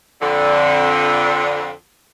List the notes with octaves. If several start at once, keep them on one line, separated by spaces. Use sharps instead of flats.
F2 D3